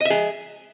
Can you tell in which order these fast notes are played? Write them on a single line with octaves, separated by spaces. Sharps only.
D#5 E5 G#4